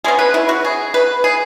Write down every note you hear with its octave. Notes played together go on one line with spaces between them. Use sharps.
B2 G#3 C#4 G#4
B4
E4
F#4
G#4
B4
G#4